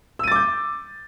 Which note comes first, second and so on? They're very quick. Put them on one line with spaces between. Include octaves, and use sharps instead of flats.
E6 D#7 A6 D6 G6